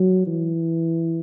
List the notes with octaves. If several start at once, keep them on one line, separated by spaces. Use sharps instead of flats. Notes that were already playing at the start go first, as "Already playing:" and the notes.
Already playing: F#3
E3